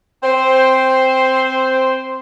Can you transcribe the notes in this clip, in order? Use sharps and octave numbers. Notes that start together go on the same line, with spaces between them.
C4 C5